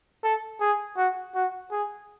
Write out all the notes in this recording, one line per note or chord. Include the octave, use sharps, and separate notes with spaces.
A4
G#4
F#4
F#4
G#4